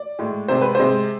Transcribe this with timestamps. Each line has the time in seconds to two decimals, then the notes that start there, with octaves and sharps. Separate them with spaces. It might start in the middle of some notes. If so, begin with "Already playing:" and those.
Already playing: D5
0.19 A2 G#3
0.48 C3 G#3 C5
0.61 B4
0.75 C3 G#3 C5